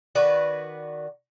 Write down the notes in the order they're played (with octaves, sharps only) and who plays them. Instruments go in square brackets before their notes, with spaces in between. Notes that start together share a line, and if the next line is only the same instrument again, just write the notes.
[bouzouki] D#3 F#4 B4 D5